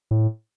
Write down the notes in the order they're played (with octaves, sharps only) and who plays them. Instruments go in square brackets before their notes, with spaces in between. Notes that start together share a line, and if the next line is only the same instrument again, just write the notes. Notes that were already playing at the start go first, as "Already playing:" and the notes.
[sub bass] A2